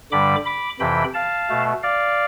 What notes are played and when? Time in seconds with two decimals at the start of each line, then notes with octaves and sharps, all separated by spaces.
0.12 G2 D3 G3 B5 D6
0.45 B5 D6
0.80 F2 C3 E3 G5 B5
1.14 F5 A5
1.49 B2 A3
1.83 D5 F5